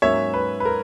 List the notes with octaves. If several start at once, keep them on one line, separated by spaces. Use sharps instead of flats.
G#2 F#3 A#3 C#4 C#5 E5
B4
B4
A#4